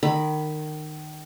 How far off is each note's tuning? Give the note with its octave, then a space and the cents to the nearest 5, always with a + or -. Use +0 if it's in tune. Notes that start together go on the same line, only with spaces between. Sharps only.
D#3 -25 B5 +0